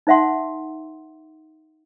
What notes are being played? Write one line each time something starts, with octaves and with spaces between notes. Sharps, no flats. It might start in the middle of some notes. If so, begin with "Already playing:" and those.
D#4 C5 E5 F#5 C6